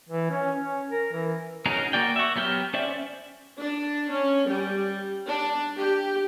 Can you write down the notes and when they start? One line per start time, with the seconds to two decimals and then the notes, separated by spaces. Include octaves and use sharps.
0.09 E3
0.31 C#4
0.61 C#4
0.90 A#4
1.13 E3
1.66 C#4 D#4 F#4 G#4 A#4
1.93 A#3 F#4 D5 G5
2.16 F#4 E5
2.36 F#3 B3 G4 G5 F6
2.74 C#4 C5 D5 E5
3.59 D4
4.10 C#4
4.49 G3
5.26 D4
5.76 G4